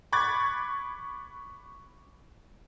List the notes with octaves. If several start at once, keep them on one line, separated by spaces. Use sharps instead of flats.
B5 C#6 D6 F#6 G#6 A6